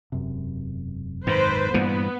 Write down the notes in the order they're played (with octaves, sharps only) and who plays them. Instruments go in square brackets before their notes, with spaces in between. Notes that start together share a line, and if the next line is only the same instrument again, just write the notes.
[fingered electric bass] E1 F#2 C3
[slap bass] G#2 D#3 [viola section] B4 C5
[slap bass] G2 A#2 E3 [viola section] B3